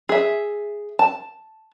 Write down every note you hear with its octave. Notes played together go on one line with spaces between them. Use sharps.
G#4 E5
A5